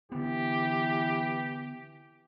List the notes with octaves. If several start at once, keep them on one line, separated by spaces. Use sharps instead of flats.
D3 E3 B3 G4